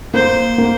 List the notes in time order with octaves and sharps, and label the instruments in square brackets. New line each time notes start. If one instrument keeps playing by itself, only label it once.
[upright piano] A#3 [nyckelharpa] C5
[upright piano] A#3